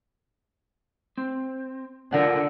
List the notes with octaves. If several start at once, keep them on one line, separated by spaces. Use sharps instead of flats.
C4
D3 F4 A#4 F#5